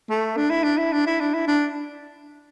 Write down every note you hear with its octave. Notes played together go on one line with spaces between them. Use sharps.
A3
D4
E4
D4
E4
D4
E4
D4
E4
D4